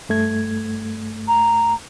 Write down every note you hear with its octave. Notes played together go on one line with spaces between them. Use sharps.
G2 A3 G#6
A#5